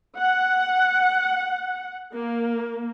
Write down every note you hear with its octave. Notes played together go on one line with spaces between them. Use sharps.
F#5
A#3